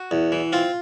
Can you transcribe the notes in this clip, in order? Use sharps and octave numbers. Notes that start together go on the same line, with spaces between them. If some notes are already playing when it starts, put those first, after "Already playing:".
Already playing: F#4
E2
E3
C4 F4